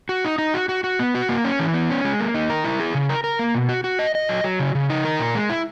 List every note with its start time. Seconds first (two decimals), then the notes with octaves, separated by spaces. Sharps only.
0.09 F#4
0.25 D#4
0.38 D#4
0.54 F#4
0.69 F#4
0.84 F#4
0.99 B3
1.15 F#4
1.29 A#3
1.45 C#4
1.59 E3
1.74 B3
1.90 C#4
2.04 G#3
2.19 A#3
2.35 D#4
2.50 A#4
2.64 E4
2.80 G#4
2.95 C#3
3.09 A#4
3.24 A#4
3.39 A#3
3.55 B2
3.69 F#4
3.84 F#4
3.99 D#5
4.15 D#5
4.29 F#3
4.44 F#3
4.59 C#3
4.75 C#3
4.90 D#4
5.05 A#4
5.20 A#2
5.35 G#3
5.50 E4